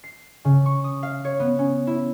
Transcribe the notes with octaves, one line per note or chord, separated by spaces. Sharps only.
C7
C#3
C#6
D#6
F5
C#5
B3
C#4
E4